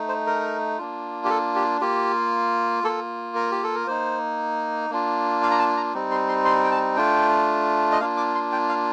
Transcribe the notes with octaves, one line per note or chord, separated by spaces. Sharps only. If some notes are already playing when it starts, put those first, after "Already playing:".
Already playing: A3 D#4
C5
A#4
A#3 D4 F4
G4
A4
G4
A#3 F4 G4
A#3 F4 A4
A#4
G4
A4
A#4
A#3 D#4 C5
A#3 D4 F4
F5
A#5
A5
A#5
G3 C4 D#4
C6
C6
C6
G5
A5
A3 D4 F4 G5
D#5
A#3 D4 F4 F5
D6
C6
G5
F5